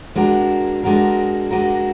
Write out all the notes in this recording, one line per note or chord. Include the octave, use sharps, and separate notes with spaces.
G#3 D4 F#4 A#4
G#3 D4 F#4 A#4
G#3 D4 F#4 A#4